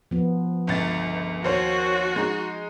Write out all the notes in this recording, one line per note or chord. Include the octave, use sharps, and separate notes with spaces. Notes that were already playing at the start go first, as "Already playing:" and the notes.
F3 B3
G1 C#2 A6
D#2 F#4 C5 C#5
G#3 D#4